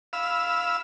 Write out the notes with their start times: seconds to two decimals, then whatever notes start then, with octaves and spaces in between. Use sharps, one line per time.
0.13 F5 B5 E6